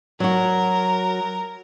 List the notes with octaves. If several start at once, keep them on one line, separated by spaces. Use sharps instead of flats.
F#3 F#4 A#4